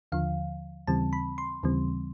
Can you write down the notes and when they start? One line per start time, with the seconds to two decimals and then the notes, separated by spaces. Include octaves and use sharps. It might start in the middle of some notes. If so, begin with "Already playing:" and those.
0.12 D#2 D3 F3 F5
0.87 D#2 C#3 E3 G3 C4 A5
1.13 B5
1.38 C6
1.63 D#2 C#3 E3 G3 C4